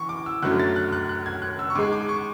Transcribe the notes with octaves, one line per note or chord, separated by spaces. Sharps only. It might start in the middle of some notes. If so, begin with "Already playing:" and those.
Already playing: E3 C#6
D6
E6
F#2 D3 F#3 A3 F#6
A6
F#6
F#6
F#6
G#6
F#6
E6
C#6
G#2 G#3 D6
D6
C#6